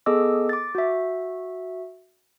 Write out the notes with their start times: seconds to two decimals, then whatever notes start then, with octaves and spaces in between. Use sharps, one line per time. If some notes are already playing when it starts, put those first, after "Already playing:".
0.06 B3 G#4 A4 D#5 D6 E6
0.49 D6 A6
0.75 F#4 E5